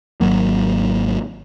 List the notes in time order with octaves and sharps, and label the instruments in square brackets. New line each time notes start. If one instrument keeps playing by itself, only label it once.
[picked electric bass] G#1 F#2 F#3 A#3